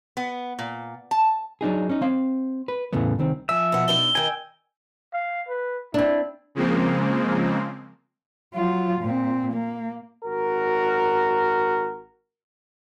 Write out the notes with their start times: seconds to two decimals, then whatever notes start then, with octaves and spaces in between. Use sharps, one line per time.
0.17 B3
0.59 A#2
1.11 A5
1.61 F#3 D4 D#4 G#4
1.89 C#4 D#4
2.02 C4 F5
2.68 B4
2.93 E2 A2 C#3 A3 B3
3.19 C2 D#3 C4
3.49 F3 E5 G#5 E6
3.72 B2 F#5
3.88 B2 D4 D#4 G7
4.15 D#3 D#5 G5 G#5
5.13 F5
5.49 B4
5.94 C4 D4 E4
6.55 C#3 F3 G#3 A#3 C4
8.54 F#3 F4
9.02 A#2 C4
9.52 A#3
10.25 G#1 F#4 A#4